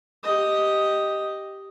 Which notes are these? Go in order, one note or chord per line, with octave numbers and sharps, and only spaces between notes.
G4 D#5